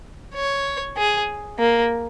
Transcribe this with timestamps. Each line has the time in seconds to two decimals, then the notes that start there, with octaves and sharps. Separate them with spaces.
0.35 C#5
0.97 G#4
1.59 A#3